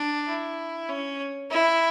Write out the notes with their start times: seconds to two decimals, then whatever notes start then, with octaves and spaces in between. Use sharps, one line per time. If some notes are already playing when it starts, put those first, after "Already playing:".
Already playing: D4
0.27 E4
0.89 C#4
1.50 E4